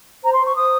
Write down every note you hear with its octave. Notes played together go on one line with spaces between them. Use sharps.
C5 A#5
C6
C5
C#6
C5 D#6